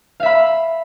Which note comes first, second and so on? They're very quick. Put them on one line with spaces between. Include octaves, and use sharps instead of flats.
F5 E5 B5